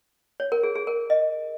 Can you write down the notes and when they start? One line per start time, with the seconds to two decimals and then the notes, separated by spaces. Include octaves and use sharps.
0.40 C#5
0.52 A#4
0.63 G#4
0.76 G#4
0.87 A#4
1.10 D#5